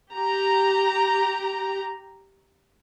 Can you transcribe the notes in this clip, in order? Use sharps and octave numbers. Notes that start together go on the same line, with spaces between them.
G4 A#5